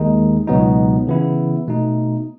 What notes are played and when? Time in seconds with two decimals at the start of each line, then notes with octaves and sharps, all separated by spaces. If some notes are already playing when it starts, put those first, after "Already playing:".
Already playing: D#2 D#3 G#3 D#4
0.47 C#2 B2 F#3 B3 D#4
1.07 C#3 E3 B3 E4
1.67 B2 A3 D#4